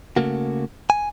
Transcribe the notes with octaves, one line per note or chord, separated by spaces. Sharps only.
C#3 A3 A#3 F#4
G#5